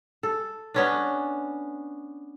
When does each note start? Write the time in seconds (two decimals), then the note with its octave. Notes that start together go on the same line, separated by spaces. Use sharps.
0.23 A4
0.74 B3 C#4 D4